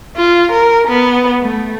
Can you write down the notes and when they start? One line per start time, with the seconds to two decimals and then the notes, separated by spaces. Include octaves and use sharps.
0.17 F4
0.52 A#4
0.87 B3
1.42 A3